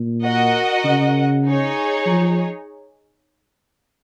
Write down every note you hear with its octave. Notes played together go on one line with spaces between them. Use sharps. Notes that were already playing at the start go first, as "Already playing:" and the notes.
Already playing: A#2
F#4 A#4 D#5 F#5
C#3
D#4 G#4 C#5
F3